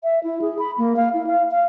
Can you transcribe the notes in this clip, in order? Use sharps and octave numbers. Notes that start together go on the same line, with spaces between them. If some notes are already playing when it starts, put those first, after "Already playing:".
E5
E4
G#4
B5
A#3
F5
E4
F5
F5